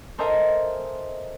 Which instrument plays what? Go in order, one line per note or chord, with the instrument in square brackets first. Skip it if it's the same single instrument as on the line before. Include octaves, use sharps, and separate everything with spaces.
[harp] A4 A#4 C5 D#5 E5 G#5